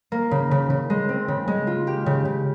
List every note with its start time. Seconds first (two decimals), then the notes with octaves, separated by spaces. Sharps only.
0.12 A#3
0.31 C#3
0.51 C#3
0.70 C#3
0.90 G#3
1.09 C4
1.28 C#3
1.48 G#3
1.67 F4
1.87 G4
2.06 C#3
2.25 C#3